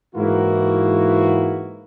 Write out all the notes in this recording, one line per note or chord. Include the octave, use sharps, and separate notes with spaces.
G#2 E3 A#3 E4 F#4